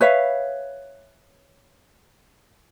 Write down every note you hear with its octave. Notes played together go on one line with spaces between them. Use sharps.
B4 C#5 E5 F5